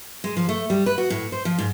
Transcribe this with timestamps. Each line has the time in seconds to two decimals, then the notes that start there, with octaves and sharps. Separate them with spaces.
0.24 G#3
0.37 F3
0.49 A3
0.70 G3
0.86 B4
0.98 F#4
1.10 A2
1.32 C5
1.45 F3
1.58 G#2